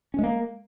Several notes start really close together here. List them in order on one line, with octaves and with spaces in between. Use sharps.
C#4 G#3 A#3